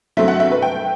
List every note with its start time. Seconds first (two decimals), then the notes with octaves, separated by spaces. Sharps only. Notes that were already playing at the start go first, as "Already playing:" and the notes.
0.17 G2 F#3 A3 C4 E5
0.28 F#5
0.40 E5
0.52 B4
0.62 G5